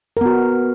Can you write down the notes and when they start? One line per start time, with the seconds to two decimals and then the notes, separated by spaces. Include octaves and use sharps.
0.17 A#4
0.21 B3
0.26 F#4